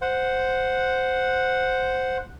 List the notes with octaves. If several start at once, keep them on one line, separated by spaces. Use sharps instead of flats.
C5 F#5